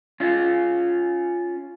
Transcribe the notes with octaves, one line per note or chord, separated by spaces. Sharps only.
C#4 F4